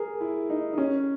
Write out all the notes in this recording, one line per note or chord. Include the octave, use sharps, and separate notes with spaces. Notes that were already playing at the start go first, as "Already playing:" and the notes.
Already playing: G#4 A#4
E4
D#4
D#4
C#4